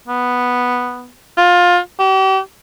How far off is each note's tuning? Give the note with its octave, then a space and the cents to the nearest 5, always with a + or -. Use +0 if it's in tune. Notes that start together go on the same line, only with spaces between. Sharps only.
B3 +0
F4 +20
G4 -40